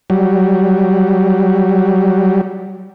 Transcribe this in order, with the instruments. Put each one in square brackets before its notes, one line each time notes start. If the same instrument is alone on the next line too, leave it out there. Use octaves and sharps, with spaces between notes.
[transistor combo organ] F#3 G3